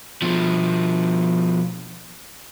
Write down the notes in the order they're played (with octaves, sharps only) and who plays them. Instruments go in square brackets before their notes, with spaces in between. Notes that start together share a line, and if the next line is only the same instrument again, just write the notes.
[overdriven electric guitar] B2 F3